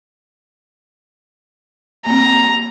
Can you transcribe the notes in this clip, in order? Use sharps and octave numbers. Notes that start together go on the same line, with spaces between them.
A#3 C4 A#5